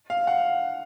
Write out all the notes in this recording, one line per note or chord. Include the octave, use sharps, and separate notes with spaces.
F5
F#5